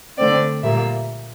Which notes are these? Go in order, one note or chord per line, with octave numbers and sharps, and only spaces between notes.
D3 A3 C4 D5
A#2 G3 A#3 E5